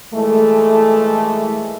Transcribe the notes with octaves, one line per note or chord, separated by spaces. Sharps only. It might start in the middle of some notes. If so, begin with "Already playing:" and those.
A#2 E3 G#3 A3